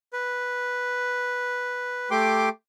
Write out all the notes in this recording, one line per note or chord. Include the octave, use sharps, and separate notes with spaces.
B4
A3 G4 G5 C6 D6